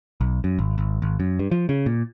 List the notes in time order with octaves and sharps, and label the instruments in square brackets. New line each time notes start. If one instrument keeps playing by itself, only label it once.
[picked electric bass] B1
F#2
G#1
G#1
G#1
F#2
G2
F3
C#3
A#2